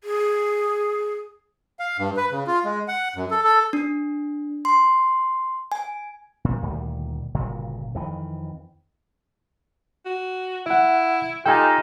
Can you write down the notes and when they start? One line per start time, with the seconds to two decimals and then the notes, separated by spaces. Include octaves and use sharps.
0.04 G#4
1.79 F5
1.98 G2
2.17 B4
2.31 C#3
2.47 F4
2.65 G#3
2.88 F#5
3.16 F#2
3.31 A4
3.44 A4
3.73 D4
4.65 C6
5.72 G#5
6.45 A#2
6.62 D2 A#2 D#3 G3
7.35 G1 A#2 C#3 F#3
7.95 F2 D#3 E3
10.05 F#4
10.66 E4 E5 F#5
11.46 D#4 F4 G4 A4 G5 G#5